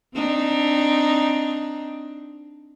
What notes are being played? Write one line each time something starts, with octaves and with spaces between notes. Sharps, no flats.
C4 D4 D#4